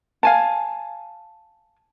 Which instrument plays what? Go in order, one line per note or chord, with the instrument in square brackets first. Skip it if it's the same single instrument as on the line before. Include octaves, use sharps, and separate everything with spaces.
[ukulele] F5 G#5 A5